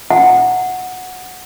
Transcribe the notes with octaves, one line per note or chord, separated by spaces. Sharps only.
F#5